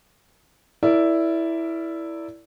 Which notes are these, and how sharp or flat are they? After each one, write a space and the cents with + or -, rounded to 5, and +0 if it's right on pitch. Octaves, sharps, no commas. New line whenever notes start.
E4 +0 A#4 -25 D5 -15